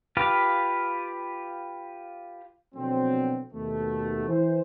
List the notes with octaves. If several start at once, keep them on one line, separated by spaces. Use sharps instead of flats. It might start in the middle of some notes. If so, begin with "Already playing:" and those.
F4 G4 B4 F5
A#1 B2 D3 F#3 B3 C4
D#2 B2 A3
E3 C5